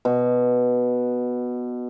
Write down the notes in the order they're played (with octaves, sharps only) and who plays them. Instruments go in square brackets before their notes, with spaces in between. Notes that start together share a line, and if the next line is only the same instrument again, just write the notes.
[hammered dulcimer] B2